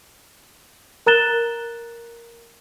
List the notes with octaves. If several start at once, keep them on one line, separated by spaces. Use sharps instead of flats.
A#4 A#5 F#6 A6 E7 G7